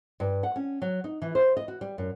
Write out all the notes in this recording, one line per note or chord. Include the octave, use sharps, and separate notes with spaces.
G2
F#5
C#4
F#3
D#4
E3
C5
D#5
F#4
G3
F#2